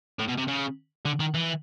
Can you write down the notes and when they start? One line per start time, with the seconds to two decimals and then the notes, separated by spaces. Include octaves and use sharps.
0.19 A2
0.28 B2
0.38 C3
0.48 C#3
1.06 D3
1.20 D#3
1.34 E3